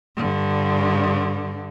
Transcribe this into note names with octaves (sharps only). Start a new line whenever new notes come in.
G2 D3